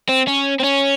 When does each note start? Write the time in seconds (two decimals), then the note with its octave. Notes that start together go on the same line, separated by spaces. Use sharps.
0.09 C4
0.27 C#4
0.60 C4
0.64 C#4